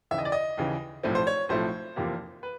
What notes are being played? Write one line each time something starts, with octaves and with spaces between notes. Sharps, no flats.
D#2 C#3 E3 E5
D#5
D5
D#5
D#2 C#3 E3
B1 A2 F3 A3 C4
C5
C#5
B1 A2 F3 A3 C4 C5
F1 E2 C3 F3 A#3
B4